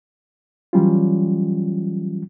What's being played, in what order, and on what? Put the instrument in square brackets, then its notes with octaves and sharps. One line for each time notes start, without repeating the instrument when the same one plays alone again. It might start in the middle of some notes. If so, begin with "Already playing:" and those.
[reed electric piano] E3 F#3 G3 C#4 F4